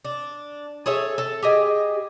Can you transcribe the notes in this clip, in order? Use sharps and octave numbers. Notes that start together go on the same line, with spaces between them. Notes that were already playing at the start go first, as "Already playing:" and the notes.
D4
G#4 A4 C#5 E5
A4
G4 G#4 D#5